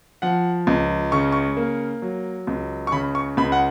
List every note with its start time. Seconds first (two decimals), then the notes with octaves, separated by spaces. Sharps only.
0.22 F3 F#5
0.67 C#2
1.12 C#3 C#6
1.32 C#6
1.57 A#3
2.02 F#3
2.47 C#2
2.87 C#6
2.92 C#3 B5
3.15 C#6
3.37 C#2 B5
3.52 F#5